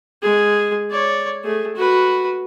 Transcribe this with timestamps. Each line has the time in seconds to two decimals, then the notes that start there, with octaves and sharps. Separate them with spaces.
0.22 G#3 G#4
0.90 C#5 D5
1.44 A3 G#4
1.75 F#4 B4